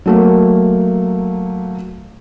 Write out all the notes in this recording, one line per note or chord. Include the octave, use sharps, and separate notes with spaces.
F#3 A3 A#3